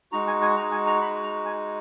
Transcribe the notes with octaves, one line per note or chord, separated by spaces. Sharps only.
G#3 D#4 F#4 A#5
G#5
G#5
A#5
G#5
A#5
B5
A#5
G#5